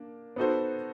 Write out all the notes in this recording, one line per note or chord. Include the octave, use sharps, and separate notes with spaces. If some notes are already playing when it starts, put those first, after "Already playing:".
Already playing: A#3 D4
B3 D#4 F#4 A4 C5